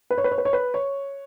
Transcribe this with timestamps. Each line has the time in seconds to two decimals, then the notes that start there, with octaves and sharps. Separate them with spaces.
0.11 B4
0.18 C#5
0.24 B4
0.31 C#5
0.38 B4
0.45 C#5
0.53 B4
0.74 C#5